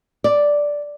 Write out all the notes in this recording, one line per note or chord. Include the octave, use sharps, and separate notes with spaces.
D5